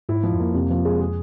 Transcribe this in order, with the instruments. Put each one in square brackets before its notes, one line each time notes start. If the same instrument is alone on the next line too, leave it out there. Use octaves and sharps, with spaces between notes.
[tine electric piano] G#2 [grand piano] E4
[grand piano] F3
[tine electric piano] F2
[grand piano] A#3
[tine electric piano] F2 [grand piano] C3
[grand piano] F3
G#3
G#4